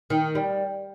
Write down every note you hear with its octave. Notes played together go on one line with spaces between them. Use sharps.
D#3
G3